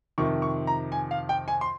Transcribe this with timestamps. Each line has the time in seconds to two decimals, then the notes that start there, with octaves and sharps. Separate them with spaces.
0.18 F2 C3 D#3 C#6
0.42 C#6
0.67 A#5
0.92 G#5
1.11 F5
1.29 G5
1.48 G#5
1.61 C6